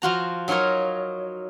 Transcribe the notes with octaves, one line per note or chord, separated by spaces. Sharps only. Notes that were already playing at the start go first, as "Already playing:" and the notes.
F3 F4 F#4 A#5
F#3 D#4 F4 A#4 C#5